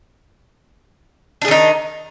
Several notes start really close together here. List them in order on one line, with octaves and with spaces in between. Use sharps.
D4 G#4 D#3 D#4